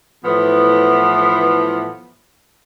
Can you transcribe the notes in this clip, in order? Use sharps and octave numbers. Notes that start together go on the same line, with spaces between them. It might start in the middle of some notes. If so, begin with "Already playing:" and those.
A2 E3 F3 B3